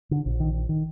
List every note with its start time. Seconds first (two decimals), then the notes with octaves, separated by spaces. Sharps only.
0.11 D3
0.26 A#1
0.40 D#3
0.69 D#3